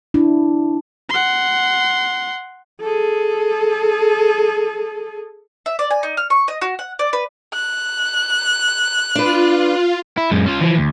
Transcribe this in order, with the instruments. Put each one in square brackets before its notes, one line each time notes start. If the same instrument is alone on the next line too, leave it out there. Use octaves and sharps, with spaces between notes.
[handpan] D4 E4
[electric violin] F#5 C6
[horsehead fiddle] G#4 A4
[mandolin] E5
D5
G#5
D#4
F6
C#6
D#5
F#4
F#5
D5
B4
[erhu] F#6
[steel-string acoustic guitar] D4 B4 [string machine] F4
[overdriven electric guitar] E4
F#2 G#3
C#4 F4
E3 F3
D2